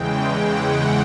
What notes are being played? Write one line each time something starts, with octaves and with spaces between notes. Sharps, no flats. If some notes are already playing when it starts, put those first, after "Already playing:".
Already playing: E2 C#3 E3 G#3 G5
F#5